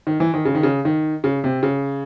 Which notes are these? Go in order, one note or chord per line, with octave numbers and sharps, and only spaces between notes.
D#3
E3
D#3
C#3
D#3
C#3
D#3
C#3
C3
C#3